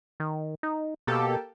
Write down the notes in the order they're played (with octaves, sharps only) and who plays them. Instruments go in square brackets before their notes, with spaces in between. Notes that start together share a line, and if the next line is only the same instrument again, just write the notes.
[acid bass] D#3
D#4
[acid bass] B2 [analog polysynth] A#3 G4 A4